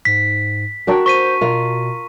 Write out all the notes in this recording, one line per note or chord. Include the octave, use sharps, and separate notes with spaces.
G#2 B6
D4 F#4 A#4 G5
C5 C#6 B6 D#7
B2 F4 A#4